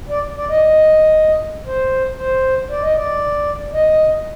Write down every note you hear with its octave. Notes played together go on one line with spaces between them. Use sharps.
D5
D5
D#5
C5
C5
D5
D#5
D5
D#5